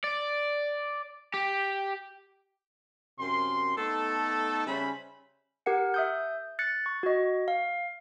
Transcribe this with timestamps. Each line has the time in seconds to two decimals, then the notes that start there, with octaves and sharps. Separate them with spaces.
0.04 D5
1.34 G4
3.19 F#2 C3 A#4 C6
3.77 A3 B3 D#4 A4
4.66 C#3 G3 C#4 C5 E5 B5
5.66 G4 A#4 F#5 C#7
5.94 E5 D#6 G6
6.59 F#6 A6 C#7
6.86 C#6
7.03 F#4 D#5
7.48 F5